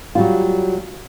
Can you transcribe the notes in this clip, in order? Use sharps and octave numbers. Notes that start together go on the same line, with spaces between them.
F#3 G3 F4